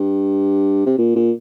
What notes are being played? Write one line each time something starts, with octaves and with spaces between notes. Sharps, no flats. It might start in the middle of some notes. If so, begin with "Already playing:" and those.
Already playing: G2
C3
A#2
A#2